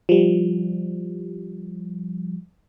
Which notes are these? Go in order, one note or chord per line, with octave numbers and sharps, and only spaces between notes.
F3 G3